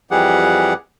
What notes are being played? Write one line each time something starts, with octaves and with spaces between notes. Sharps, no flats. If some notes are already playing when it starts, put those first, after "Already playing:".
F2 E3 G3 G4 G#4 F#5